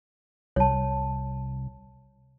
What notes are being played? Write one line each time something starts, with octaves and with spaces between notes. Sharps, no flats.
C2 C#5 A5